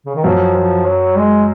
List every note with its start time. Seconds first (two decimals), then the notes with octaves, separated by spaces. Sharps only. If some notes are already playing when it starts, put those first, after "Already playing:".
0.06 C#3
0.16 D#3
0.24 F#2 F3
0.56 F3
0.86 F#3
1.17 G#3